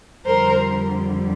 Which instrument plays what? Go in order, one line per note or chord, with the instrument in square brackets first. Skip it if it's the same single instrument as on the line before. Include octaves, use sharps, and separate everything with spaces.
[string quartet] F2 D3 G3 A#4 C5